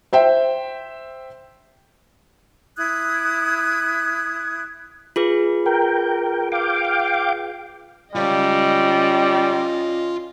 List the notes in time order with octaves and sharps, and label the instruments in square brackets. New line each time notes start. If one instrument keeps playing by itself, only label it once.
[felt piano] C5 E5 G5
[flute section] E4 D#6 F#6 G#6
[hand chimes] F4 G#4 B4
[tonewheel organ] A#4 G5
F5 G5 D6
[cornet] G3 [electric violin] C#4 D#5 [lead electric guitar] F4 C#5